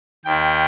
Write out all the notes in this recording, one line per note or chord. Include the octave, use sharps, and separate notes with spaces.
D#2 D#3 G5